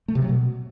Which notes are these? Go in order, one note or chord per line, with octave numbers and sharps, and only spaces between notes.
A3
C3
F#3
B2